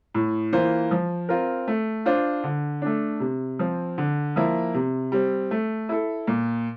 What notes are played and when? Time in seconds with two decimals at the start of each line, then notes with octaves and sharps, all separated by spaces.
0.14 A2
0.53 E3 A#3 F4 C5
0.91 F3
1.29 C4 F4 A#4
1.68 A3
2.06 D4 F4 C5
2.44 D3
2.82 A3 D4
3.20 C3
3.59 F3 C4
3.98 D3
4.36 F3 A#3 E4
4.74 C3
5.12 G3 C4
5.51 A3
5.89 E4 A4
6.27 A#2